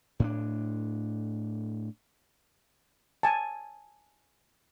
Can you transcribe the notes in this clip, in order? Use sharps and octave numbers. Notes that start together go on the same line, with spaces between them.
A2 C4 D4
G#5 A5